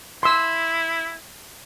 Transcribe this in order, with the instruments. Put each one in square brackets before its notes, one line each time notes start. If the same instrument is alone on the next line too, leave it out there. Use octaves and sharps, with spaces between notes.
[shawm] E4 [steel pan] C6 E6